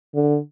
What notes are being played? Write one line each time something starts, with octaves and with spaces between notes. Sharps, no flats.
D3